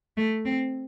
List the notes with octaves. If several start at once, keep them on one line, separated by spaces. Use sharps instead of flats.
A3
C4